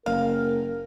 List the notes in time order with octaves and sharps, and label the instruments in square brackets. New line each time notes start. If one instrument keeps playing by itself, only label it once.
[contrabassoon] F#1 [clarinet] A#4 [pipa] F5